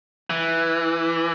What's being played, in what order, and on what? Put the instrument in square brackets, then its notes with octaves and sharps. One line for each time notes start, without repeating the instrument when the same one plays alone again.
[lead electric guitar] E3